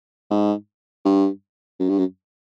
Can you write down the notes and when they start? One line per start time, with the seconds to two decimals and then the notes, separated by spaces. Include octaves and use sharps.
0.30 G#2
1.05 G2
1.80 F#2
1.89 G2
1.99 F#2